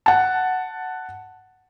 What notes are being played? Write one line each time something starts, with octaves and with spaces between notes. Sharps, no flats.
F#5 A5